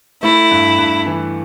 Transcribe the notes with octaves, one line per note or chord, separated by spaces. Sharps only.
A3 E4
G2
G2
E3